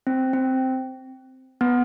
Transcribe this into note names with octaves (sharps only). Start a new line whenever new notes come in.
C4
C4
B3